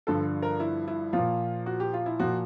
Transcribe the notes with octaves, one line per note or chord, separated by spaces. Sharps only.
G2 D3 F3 A4
A#4
E4
E4
A#2 F3 F4
F#4
G4
F4
E4
A#2 F3 F#4